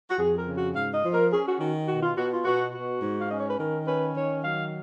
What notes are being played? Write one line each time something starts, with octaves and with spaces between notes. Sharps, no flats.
F#4
F2 G#4
A#4
C#3
F#4
G#2 F5
D#5
F3
A#4
C#4 G#4
F#4
D#3 F#4
B2 F#4
F4
B2 F#4
F4
B2 F#4
B2 F#4
G#2
F5
C#4 D#5
C#5
B4
D#3 A#4
C#4 B4
D#3 C#5
F#3 F5